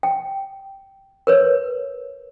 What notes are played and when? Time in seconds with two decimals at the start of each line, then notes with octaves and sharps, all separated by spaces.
0.03 G5
1.27 A#4 B4 C#5